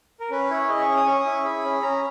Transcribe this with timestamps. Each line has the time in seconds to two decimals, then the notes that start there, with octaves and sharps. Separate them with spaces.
0.20 A#4
0.30 C#4 B4
0.50 E4 C#5
0.69 G#4 D#5
0.81 C#6
0.88 C#4
0.97 D#6
1.06 C#4 C#6
1.19 D#6
1.26 E4
1.32 C#6
1.44 G#4 B5
1.64 C#4
1.82 C#4 A#5